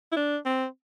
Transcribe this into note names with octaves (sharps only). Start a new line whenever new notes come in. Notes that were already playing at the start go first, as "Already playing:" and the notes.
E4
D4
C4